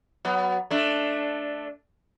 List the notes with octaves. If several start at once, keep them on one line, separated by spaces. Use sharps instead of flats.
F#3 B3
A3 D4